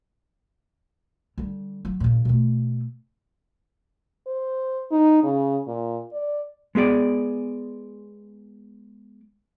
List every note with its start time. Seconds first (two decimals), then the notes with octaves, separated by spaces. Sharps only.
1.38 D3 G3
1.85 F#3
2.00 A#2 C#3
2.25 B2 A3
4.27 C5
4.91 D#4
5.23 C#3
5.67 A#2
6.13 D5
6.75 G#3 B3 G#4 D5